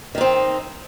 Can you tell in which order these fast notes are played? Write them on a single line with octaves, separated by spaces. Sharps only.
D#3 D#4 C4